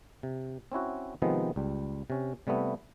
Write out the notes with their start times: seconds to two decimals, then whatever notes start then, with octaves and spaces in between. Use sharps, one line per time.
0.23 C3
0.72 C4 C#4 E4 F#4
1.22 C3 D#3 F3 G#3 B3 C4
1.56 C#2 G3
2.10 C3 C#4
2.47 C3 G3 A3 B3 E4